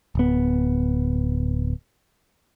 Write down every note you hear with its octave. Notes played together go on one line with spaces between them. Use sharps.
D1 B3